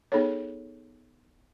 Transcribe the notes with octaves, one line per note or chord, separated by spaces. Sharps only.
B3 D#4 G#4 A4 C#5